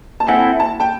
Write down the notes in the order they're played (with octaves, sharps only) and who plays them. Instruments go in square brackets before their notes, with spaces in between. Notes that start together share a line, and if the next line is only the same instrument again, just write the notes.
[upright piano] A5
[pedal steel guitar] C4 E4 A4 [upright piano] F#5 G#5
[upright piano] A5
G5 A5